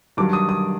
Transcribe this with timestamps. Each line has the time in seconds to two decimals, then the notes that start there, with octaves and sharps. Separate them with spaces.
0.17 G2 D#3 F#3 D6
0.33 D#6
0.49 D#6